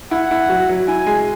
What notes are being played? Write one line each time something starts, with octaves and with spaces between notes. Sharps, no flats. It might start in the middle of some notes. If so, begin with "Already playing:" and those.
E4 F#5
E4
F#3
F#3
E4 G#5
G#3